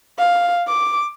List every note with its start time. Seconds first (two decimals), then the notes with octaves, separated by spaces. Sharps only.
0.18 F5
0.68 D6